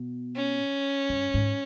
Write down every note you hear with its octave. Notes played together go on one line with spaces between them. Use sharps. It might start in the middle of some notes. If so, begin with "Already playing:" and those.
Already playing: B2
C#4
G2
G#2